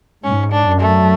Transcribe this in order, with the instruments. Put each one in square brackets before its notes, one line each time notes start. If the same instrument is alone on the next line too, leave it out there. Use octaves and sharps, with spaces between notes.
[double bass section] G#2 [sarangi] C#4
[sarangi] D4
[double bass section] F#2
[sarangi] A3